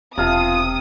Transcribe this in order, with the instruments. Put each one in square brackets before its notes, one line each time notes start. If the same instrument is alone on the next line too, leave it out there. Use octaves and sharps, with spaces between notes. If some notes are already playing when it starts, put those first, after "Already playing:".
[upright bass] E1 [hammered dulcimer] C3 F5 A5 [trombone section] F4 [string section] D#6